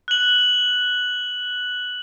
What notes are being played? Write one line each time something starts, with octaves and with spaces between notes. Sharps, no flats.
F#6 F#7